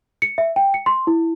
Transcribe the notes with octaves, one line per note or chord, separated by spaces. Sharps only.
C#7
E5
G5
C#7
C6
E4